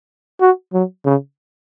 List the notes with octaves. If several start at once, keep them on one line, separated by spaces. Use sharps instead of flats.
F#4
F#3
C#3